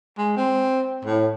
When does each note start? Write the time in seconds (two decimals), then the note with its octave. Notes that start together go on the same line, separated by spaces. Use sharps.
0.18 G#3
0.37 C4
1.05 A2